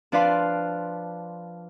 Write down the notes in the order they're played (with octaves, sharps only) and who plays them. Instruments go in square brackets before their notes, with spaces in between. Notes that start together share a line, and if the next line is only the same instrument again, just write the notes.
[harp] F3 D4 B4 D5 F5 C6